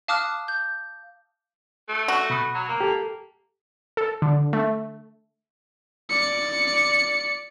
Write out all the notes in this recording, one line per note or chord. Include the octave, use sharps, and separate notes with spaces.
F5 A5 D6 D#6 F6 F#6
G6
A3
F#4
B2 B5 D#6
F#3
A#3
G4 A4
A4
D3
A3
D5 C#7